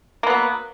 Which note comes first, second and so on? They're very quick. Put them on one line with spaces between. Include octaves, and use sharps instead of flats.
A#3 B3 F#3